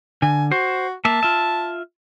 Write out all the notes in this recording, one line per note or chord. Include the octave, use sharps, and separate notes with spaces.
D3 G#5
F#4 C5
A#3 E5 A5
F4 E5